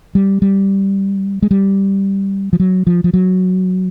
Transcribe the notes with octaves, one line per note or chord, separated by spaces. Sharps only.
G3
G3
G#3
G3
F3
F#3
F3
F3
F#3